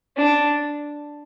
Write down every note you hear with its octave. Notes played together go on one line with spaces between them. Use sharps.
D4